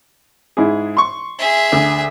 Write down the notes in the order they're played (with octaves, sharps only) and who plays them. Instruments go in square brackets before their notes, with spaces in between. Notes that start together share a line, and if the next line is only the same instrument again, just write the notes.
[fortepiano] G#2 E4 G#4
C6 C#6
[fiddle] G#4 E5
[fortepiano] D2